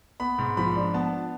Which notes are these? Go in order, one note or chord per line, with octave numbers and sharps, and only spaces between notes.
B3 B5
G#2
F3 B5
D4
B3 A5